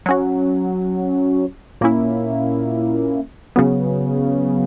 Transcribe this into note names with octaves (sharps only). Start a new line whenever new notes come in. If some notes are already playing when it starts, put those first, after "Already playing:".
F#3 C#4 F#4
A#2 A#3 C#4 E4
C#3 F#3 B3